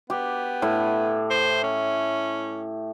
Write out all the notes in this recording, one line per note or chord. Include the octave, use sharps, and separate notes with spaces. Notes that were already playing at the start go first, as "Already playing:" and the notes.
B3 G4
A2
C5
C#4